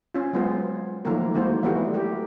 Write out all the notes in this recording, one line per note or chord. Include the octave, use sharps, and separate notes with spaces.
C#4 F4
F#3 G#3 B3 C4 F4
D#3 F3 F#3 A3 A#3 A#4
D#3 G#3 A#3 E4 F#4 C5
E3 F#3 G3 A3 B3 F#4
A3 G4 A#4